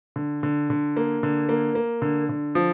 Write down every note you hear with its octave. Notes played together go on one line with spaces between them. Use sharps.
D3
D3
D3
A#3
D3
A#3
A#3
D3
D3
F3